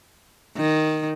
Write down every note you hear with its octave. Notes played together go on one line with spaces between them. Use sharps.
D#3